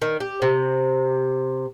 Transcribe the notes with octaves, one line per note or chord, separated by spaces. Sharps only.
D#3
G4
C3